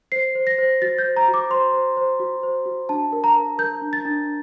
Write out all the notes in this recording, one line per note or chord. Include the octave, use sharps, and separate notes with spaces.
C5 C7
C5
A#6
C5
F#4 A6
G6
C5
A#5
F#4
D6
C5 C6
C5
C5
F#4
C5
F#4
D4 A5
A#4
A#5
A#4
A#4 G6
D4
A6
D4